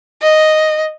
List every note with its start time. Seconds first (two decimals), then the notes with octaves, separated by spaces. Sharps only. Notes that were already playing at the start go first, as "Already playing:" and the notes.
0.22 D#5